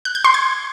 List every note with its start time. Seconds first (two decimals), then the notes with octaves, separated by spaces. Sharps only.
0.05 F#6
0.15 G6
0.24 C6
0.34 G#6